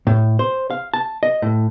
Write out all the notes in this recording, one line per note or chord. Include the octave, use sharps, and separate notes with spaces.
A2
C5
F5
A5
D#5
A2